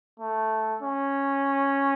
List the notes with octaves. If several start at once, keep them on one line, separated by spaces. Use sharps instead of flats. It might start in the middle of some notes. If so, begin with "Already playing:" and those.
A3
C#4